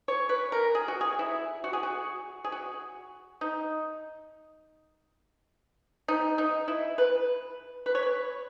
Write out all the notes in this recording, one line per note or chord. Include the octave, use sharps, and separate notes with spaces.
C#5
B4
A#4
G#4
F#4
G#4
E4
F#4
G#4
F#4
G#4
F#4
D#4
D#4
D#4
E4
B4
B4
C#5
B4